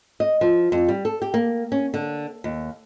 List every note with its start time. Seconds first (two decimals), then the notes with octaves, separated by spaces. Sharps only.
0.20 D#5
0.41 F3
0.72 F2
0.88 G3
1.05 A4
1.22 G4
1.34 A#3
1.72 C#4
1.94 D3
2.44 D#2